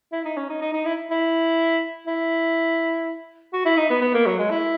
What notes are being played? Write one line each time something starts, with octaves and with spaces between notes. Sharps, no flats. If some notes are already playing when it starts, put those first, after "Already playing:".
E4
D#4
C#4
D#4
D#4
D#4
E4
E4
E4
F#4
E4
D#4
B3
B3
A#3
F#3
G#3
E4